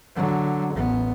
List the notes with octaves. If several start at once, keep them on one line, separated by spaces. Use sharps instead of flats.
D3 F#3
A1 B3